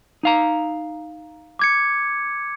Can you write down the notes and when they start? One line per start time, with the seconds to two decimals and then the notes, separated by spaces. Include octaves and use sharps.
0.23 D#4 F5 A#5
1.59 D6 G#6 C#7